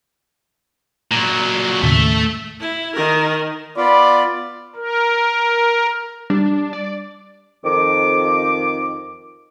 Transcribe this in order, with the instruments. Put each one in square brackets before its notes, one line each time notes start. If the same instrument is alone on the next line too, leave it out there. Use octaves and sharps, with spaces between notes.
[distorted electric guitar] A#2 F#3
[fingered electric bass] D#2 A2 C#3 [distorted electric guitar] A3 E5
[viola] E4
D#3 A#4
[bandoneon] B3 F4 [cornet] D5 [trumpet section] B5
[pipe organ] A#4
[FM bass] G3 [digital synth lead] D4
[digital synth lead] D5
[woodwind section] F2 D#3 D6